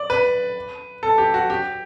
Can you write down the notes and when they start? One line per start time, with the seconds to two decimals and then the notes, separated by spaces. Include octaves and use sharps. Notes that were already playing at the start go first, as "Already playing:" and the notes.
Already playing: D5
0.10 B4
1.03 A4
1.18 G4
1.34 F#4
1.50 G4